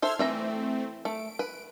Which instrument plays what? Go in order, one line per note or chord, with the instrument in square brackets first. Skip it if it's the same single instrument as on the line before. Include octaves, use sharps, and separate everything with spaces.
[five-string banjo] A4 C5 E5 [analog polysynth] C6 F6 G#6
[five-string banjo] E3 E5 A#5 [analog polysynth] A3 C4
[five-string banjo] A3 [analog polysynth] D7
[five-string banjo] B4